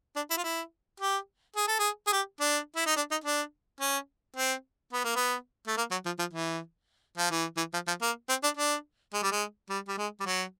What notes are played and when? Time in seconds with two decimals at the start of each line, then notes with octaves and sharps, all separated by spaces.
0.16 D4
0.31 E4
0.37 F4
0.44 E4
1.00 G4
1.56 G#4
1.68 A4
1.79 G#4
2.08 G#4
2.12 G4
2.41 D4
2.76 E4
2.87 D#4
2.97 D4
3.11 D#4
3.24 D4
3.81 C#4
4.37 C4
4.93 B3
5.04 A#3
5.16 B3
5.67 A3
5.77 A#3
5.91 F#3
6.06 F3
6.19 F3
6.33 E3
7.18 F3
7.31 E3
7.57 E3
7.73 F3
7.87 F3
8.02 A#3
8.29 C4
8.44 D4
8.57 D4
9.14 G#3
9.23 G3
9.32 G#3
9.70 G3
9.88 G3
9.98 G#3
10.20 G3
10.26 F#3